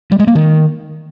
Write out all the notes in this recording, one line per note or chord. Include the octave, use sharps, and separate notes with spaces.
G3
G#3
A#3
D#3